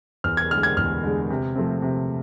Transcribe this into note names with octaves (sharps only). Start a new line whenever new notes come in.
E2 F6
G#6
D3 G#3 F6
G#6
E2 F6
D3 G#3
C3
F3 A3 C4
C3